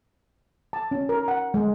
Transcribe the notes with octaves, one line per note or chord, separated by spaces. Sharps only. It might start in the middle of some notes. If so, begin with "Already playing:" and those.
A5
C#4
A#4
F#5
G#3